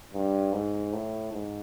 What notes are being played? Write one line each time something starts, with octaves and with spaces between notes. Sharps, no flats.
G2
G#2
A2
G#2